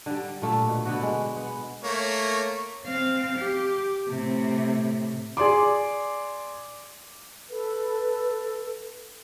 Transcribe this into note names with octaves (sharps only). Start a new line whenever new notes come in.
D3 G3
A#2 A3
B2
D3 B3 F#4
G#3
B3
A3 A#3 C#5
C4 F5
G4
A2 C3
G#4 D5 C6 D6
A4 B4